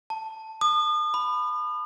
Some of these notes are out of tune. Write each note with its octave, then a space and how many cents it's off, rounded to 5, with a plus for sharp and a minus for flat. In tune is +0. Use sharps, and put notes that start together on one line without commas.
A5 +5
D#6 -40
B5 +15